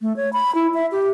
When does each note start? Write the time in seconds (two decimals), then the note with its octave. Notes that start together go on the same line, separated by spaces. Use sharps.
0.02 A3
0.16 C#5
0.33 B5
0.55 E4
0.74 E5
0.92 G4